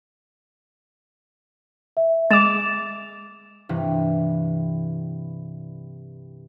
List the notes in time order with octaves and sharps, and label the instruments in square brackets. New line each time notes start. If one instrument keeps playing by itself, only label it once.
[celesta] E5
[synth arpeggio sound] G#3 D6 [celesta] A6 E7 F7
[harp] G2 C3 E3